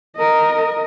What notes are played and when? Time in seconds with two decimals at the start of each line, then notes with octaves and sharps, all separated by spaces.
0.16 A#4 D#5